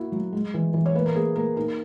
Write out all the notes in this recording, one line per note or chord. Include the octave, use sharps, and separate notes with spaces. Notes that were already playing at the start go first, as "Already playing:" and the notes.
Already playing: A#3 E4 F#4
F#3
G#3
E3
E3
C#5
A#3 B4
A#4
A#3 G#4
A#3 A#4
D#4 A#4